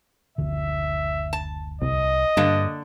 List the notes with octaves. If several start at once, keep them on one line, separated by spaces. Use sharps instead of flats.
F#1 D2 D3 E5
A5
C2 D#5
G2 D3 A#3 D4